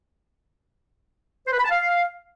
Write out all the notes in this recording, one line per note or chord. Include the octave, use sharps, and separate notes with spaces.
C5
B4
B5
A5
F5